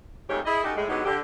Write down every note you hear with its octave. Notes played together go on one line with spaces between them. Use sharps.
F2 G#2 D#3 A3 G4 C#5
E4 G#4 D#5
C#4 D#4 F#4 G4 A4
A2 G#3
D3 F#3 G#3 B3 D#4 G4
D3 G4